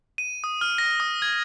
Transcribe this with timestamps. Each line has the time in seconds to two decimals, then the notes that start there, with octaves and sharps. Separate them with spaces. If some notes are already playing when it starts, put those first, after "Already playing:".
0.18 D#7
0.44 D#6
0.61 F6
0.78 A#6
1.00 D#6
1.22 G#6